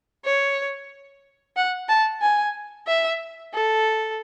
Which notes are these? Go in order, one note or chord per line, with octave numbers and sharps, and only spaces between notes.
C#5
F#5
A5
G#5
E5
A4